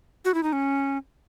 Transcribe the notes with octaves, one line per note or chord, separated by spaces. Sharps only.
F#4
E4
D#4
C#4